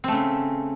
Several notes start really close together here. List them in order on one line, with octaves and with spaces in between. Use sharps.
C4 A3 C#3